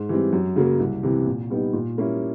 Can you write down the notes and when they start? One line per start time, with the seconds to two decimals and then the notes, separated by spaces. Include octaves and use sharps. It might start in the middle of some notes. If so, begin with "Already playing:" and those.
Already playing: G#2
0.09 E3 G3 C4
0.33 F#2
0.56 C#3 F#3 A#3
0.80 C2
1.03 C3 E3
1.26 A#2
1.50 G3 B3 D#4
1.73 A#2
1.97 G3 A#3 C#4 E4